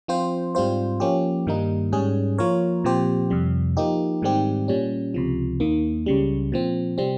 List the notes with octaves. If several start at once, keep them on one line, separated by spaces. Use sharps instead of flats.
F3 C4 F4 C5
G#2 G3 C4 F4 C5
F3 A#3 C#4 G4
G2 D#3 G3 A#3 D#4
G#2 G3 C#4 G#4
F3 A#3 F4 A#4 C#5
A#2 F3 C4 G4 C5
F2 C3 G3
F3 A#3 D#4 G4
G#2 D#3 G3 C4 G4
A#2 G3 C#4
C#2 C3 F3
D#2 D#3 A#3
C#2 C#3 G3
A#2 F3 C4
C3 G3 C4